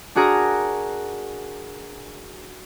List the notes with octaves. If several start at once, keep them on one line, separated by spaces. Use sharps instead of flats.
D4 F#4 G#4 A#4